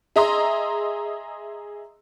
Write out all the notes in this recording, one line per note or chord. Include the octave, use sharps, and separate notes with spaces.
G#4 D#5 E5 A#5 C6 D#6